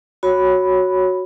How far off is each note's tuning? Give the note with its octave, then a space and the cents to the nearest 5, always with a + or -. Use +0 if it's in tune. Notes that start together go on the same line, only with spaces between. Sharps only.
F#4 +0 C#5 +0 B5 +0